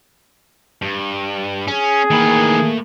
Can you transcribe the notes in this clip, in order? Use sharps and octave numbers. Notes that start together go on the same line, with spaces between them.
G2
C#4 G#4
D#3 E3 A3 A#3 B5